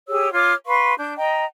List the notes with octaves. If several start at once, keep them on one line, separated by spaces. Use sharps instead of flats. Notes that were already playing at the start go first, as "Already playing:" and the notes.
G4 G#4 C#5 E6
F4 C#5 D6 F6
B4 F5 C6 C#6
D4 G6
D#5 G5 A#5